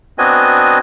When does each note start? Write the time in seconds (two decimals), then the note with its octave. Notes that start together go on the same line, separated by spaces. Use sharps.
0.18 B3 C4 D4 F#4 D#5 G#5